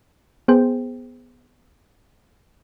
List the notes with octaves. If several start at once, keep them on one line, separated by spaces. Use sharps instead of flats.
B3 G#4 C5 G5